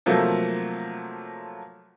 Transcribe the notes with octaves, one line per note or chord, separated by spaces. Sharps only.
C3 F3 F#3 A3 A#3